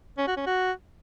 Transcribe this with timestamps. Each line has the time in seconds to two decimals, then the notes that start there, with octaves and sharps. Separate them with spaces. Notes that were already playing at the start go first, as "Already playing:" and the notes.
0.18 C#4
0.27 F#4
0.37 C#4
0.46 F#4